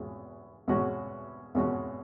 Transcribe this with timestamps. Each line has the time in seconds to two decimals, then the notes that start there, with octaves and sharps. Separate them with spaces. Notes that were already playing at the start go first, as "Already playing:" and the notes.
Already playing: E2 B2 G#3 C#4 F#4
0.68 E2 B2 G#3 C#4 F#4
1.55 E2 B2 G#3 C#4 F#4